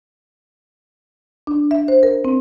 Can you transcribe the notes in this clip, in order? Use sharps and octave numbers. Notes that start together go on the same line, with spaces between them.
D4
E5
C5
A#4
C4